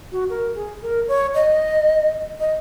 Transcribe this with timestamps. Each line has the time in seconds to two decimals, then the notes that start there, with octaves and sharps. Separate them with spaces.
0.12 F#4
0.29 A#4
0.55 G#4
0.82 A#4
1.08 C#5
1.34 D#5
2.39 D#5